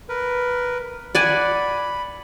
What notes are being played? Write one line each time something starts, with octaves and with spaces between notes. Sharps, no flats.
A#4 B4
D5 F#5 G#5 B5